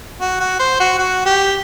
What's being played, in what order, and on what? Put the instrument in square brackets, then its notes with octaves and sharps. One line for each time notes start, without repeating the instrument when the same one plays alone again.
[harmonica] F#4
F#4
C5
F#4
F#4
G4